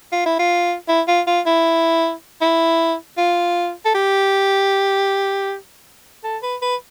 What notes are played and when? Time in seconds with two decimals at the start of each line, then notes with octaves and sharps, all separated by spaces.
0.12 F4
0.26 E4
0.39 F4
0.88 E4
1.08 F4
1.27 F4
1.46 E4
2.41 E4
3.18 F4
3.85 A4
3.95 G4
6.24 A4
6.43 B4
6.62 B4